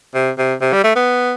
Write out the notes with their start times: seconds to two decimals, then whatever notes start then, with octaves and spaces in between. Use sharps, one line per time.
0.14 C3
0.38 C3
0.61 C3
0.73 G3
0.84 A3
0.96 B3